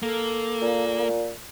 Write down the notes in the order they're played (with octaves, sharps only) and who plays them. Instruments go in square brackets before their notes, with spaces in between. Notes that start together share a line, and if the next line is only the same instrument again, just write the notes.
[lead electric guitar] A#3 [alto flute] A4
[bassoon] A#2